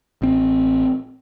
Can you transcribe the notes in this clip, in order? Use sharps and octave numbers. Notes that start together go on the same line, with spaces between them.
A1 C4